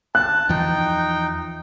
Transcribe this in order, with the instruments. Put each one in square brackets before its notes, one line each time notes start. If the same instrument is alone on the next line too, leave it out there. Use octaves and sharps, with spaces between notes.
[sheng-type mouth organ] A5 [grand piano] F#6
[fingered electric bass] E2 E3 F3 [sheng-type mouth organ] D#4 G5